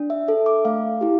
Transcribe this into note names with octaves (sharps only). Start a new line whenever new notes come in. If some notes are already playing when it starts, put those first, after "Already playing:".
Already playing: D4
E5
A4 E5
D6
A3 F5
E4 G4